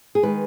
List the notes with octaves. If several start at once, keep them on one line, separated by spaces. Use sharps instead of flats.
G#4
D#3 G#3 B4